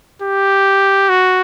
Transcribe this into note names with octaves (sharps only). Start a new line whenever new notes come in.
G4
F#4